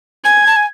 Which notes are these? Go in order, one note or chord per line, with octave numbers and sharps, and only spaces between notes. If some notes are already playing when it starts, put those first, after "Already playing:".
G#5 G#6
A5
G#5